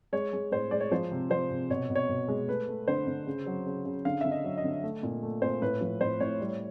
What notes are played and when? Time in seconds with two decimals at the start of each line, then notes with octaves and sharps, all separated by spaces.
0.13 G#3 C#5
0.33 G#3
0.52 A2 C5
0.71 G#3 D5
0.81 C#5
0.91 F3 C5
1.11 C3
1.30 F3 C5
1.50 C3
1.70 B2 C#5
1.90 B2
1.96 C#5
2.09 B2
2.28 G#3
2.48 A3 B4
2.68 A3
2.88 D3 C5
3.07 D3
3.27 C#3
3.46 F#3
3.66 C#3
3.85 C#3
4.05 D3 F5
4.21 D3 E5
4.32 D#5
4.44 F#3
4.58 D#5
4.64 D3
4.83 A3
5.03 A#2
5.23 A3
5.42 A#2 C5
5.62 A2 B4
5.81 F3
6.01 A2 C5
6.20 A2 C#5
6.40 G3